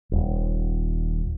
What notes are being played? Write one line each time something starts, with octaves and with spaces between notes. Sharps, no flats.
D#1